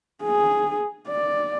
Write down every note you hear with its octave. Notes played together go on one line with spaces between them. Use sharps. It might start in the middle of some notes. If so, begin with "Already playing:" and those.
G#4
D5